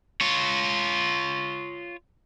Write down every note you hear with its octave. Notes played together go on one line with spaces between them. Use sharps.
F4 C#5